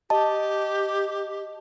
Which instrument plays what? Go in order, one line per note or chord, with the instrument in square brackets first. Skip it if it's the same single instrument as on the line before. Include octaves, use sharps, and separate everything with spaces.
[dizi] G4 [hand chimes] D#5 A5